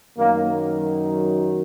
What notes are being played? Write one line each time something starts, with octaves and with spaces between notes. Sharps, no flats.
F#2 D#3 F#3 A#3